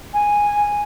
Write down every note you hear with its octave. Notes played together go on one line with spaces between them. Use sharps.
G#5